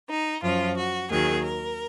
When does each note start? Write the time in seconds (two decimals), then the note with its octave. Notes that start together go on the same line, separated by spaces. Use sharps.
0.08 D#4
0.42 F#2 F3 F4
0.77 F#4
1.10 D#2 D#3 F#3 G#4
1.44 A#4